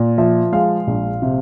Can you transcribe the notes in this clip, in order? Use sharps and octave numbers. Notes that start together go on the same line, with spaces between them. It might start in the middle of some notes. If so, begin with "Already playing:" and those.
Already playing: A#2
F3 E5
G#3 F5
A#1
C3